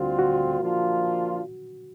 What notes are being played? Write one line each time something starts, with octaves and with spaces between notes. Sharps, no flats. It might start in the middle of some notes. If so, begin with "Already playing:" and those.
Already playing: D2 D3 G3 C4 F4 F#4
F#4
F3 A#3 D4 F4